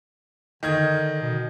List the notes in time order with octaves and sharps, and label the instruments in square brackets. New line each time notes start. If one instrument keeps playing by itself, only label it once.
[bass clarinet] D3 [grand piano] D#3 D#5 G#6
[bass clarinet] B2